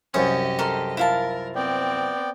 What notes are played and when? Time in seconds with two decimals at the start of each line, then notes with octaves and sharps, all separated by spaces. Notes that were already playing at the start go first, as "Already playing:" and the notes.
0.14 C2 F#2 C#4 G4 D#5 D#6
0.59 A4 A#4 C6
0.97 E4 F4 A#4 A5
1.55 B3 C4 D5 G5